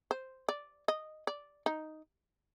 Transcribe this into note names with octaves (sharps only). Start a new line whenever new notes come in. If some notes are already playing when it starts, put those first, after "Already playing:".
C5
D5
D#5
D5
D#4